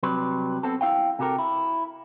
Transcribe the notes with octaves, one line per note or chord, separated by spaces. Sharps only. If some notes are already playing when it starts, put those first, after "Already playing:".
C3 F#3 G3 B4
B3 C4 A4
E4 F5 G5
C3 F#4 G4 A4 A#4
E4